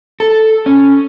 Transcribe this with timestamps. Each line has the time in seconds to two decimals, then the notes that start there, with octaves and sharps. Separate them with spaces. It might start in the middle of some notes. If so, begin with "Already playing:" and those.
0.20 A4
0.66 C#4